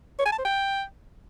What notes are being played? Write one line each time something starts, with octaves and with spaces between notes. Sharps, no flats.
C#5
G#5
A5
C5
G5